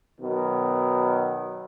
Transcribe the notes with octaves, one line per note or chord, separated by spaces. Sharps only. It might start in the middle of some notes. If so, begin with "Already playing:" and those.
B2 D#3 F#3